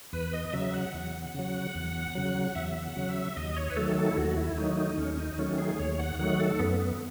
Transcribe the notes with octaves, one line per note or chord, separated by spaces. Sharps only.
E2 B4
D#5
C#3 F#3 E5
F#5
E2
C#3 F#3
E2
C#3 F#3
E2 E5
F#5
C#3 F#3
E5
D#2 D#5
C#5
B4
D#3 F#3 A3 A4
A4
E4
D#2 F#4
E4
D#3 F#3 A3 D#4
D#4
D#2 C#4
C#4
D#4
D#3 F#3 A3 C#4
G#4
D#2 C#5
F#5
D#3 F#3 A3 F#5
A4
F#2 B3
B3